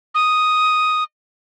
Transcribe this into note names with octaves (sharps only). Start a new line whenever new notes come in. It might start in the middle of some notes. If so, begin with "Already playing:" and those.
D#6